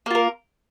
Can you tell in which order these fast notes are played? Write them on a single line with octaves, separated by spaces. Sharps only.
A#3 F4 A#4